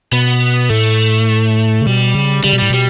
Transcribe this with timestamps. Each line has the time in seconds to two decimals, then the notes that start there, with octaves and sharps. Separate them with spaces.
0.12 B2 B3
0.70 A2 A3
1.81 C#3
1.87 B2 G3
2.15 C#3
2.44 C#3 G3
2.53 B2
2.58 A2 G3
2.70 B2 G3